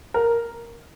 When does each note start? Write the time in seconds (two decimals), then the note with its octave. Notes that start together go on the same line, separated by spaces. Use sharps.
0.14 A#4